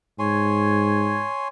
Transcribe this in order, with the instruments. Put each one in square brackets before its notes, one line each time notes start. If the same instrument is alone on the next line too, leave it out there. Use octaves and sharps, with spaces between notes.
[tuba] G#2 [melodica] C#5 G#5 C6